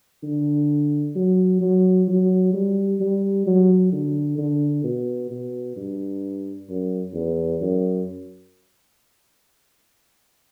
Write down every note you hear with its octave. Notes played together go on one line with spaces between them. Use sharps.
D3
F#3
F#3
F#3
G3
G3
F#3
D3
D3
B2
B2
G2
F#2
E2
F#2